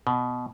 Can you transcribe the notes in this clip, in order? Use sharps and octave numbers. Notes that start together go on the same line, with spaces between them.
B2